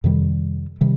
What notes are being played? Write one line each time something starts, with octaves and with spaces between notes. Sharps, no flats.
F2 C3 D#3 G3
C3 D#3 G3